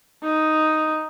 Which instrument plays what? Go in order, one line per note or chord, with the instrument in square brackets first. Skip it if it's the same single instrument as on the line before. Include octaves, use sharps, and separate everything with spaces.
[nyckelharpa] D#4